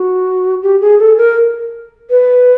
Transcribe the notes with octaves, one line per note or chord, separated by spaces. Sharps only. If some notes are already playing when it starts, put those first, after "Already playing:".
Already playing: F#4
G4
G#4
A4
A#4
B4